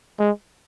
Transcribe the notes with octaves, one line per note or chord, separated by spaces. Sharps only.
G#3